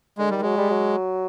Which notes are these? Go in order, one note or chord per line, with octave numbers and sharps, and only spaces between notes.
D3 G#3
D#3 G3
F#3 G#3
G3
F#3